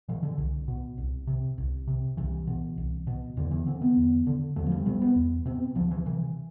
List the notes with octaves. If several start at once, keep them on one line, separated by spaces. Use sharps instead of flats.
B2 E3
D3
C2
B2
C2
C3
C2
C3
C2 E3
B2
C2
B2
E2 D3
E3
D3 C4
B3
E2
D3
E2 A3
F3
G3
B2 G3
B3
E2
B2 C4
D2 F3
E3
C3 E3